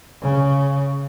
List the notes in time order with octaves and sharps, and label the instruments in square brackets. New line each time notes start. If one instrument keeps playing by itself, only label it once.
[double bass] C#3